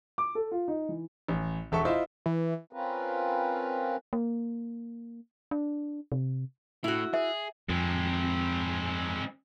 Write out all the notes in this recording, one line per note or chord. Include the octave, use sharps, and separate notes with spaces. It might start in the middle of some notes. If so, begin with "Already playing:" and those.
D6
A4
F4
D#4
E3
A1
E1 A4 E5 C#6
E4 F4 C5 D#5 E5
E3
C4 C#4 F4 A#4 B4
A#3
D4
C3
A2 E4 F#4
G#4 E5
F2 G#3 C4